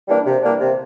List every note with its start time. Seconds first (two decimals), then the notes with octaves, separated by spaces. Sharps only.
0.08 E3 G3 A#3 D4
0.26 C3
0.43 E3 G3 A#3 D4
0.60 C3